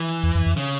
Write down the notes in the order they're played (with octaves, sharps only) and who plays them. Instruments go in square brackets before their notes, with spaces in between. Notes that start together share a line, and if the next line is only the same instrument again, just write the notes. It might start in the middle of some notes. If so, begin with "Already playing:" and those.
Already playing: [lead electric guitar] E3
[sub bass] E2
F2
F2
[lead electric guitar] C#3